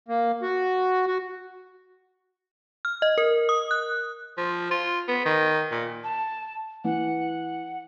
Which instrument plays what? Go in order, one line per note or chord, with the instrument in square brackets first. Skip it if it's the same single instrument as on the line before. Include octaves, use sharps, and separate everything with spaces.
[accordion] A#3
F#4
F#4
[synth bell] F6
D#5
A#4
D#6
F#6
[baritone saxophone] F3
F4
B3
D#3
A#2
[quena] A5
[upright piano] E3 [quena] F#5